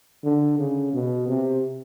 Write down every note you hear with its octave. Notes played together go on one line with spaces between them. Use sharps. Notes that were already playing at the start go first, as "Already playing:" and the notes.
D3
C#3
B2
C3